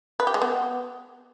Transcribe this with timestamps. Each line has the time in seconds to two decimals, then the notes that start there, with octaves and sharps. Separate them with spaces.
0.20 B4
0.27 G4
0.34 G#3
0.42 B3